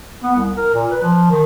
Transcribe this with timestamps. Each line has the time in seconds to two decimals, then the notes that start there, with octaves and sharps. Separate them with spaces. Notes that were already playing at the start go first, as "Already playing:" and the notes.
0.22 B3
0.36 C2
0.56 A#4
0.74 A#2
0.91 B4
1.02 F3
1.30 D#3